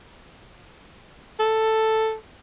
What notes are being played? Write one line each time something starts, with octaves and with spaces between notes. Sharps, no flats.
A4